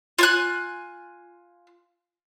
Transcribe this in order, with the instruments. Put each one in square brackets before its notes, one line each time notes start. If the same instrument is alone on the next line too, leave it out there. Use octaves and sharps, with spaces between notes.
[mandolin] F4 G#5 F#6